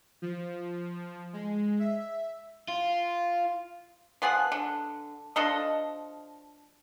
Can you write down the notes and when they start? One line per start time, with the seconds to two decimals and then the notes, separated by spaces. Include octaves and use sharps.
0.22 F3
1.33 G#3
1.79 E5
2.68 F4
4.22 F3 B3 G#4 F#5
4.52 D3
5.36 F3 D4 A4 D#5